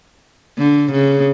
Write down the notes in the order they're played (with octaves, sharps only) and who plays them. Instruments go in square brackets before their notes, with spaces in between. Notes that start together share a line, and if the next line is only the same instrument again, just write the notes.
[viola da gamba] D3
C#3